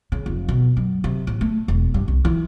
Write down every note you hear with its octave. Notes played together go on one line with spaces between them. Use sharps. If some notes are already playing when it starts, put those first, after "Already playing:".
C#3
F1
B2
F#2
C3
A1
A3
E1
G2
C2
E3